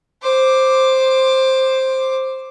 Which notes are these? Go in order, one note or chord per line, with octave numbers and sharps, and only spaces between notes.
C5 D6